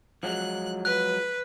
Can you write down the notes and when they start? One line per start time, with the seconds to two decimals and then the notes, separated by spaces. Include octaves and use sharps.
0.23 F3 F#3 G#3 F#6
0.85 B4 F#6